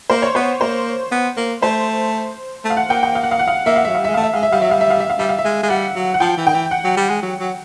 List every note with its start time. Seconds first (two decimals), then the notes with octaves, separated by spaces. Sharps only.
0.10 A#3 C5
0.22 C#5
0.35 B3 C5
0.60 A#3 C5
1.11 B3
1.37 A#3
1.62 A3 C5
2.64 A3
2.70 F5
2.77 F#5
2.89 A#3 G5
3.03 G5
3.15 F5
3.23 F#5
3.31 F5
3.39 F#5
3.48 F5
3.66 A#3 E5
3.76 F5
3.85 F#3 E5
3.95 G3 F5
4.05 G#3 E5
4.14 A3 F5
4.23 E5
4.33 G#3 F5
4.43 E5
4.51 G3 F5
4.61 F#3 E5
4.71 G3 F5
4.81 E5
4.90 F5
5.00 E5
5.10 F5
5.19 G3 E5
5.29 F5
5.39 E5
5.44 G#3
5.63 G#3
5.69 G3 F#5
5.95 F#3
6.14 F#5
6.20 F3 G5
6.37 E3
6.47 D#3 G5
6.54 E3
6.71 F#5
6.84 F#3
6.97 G3
7.09 G#3
7.22 F#3
7.40 F#3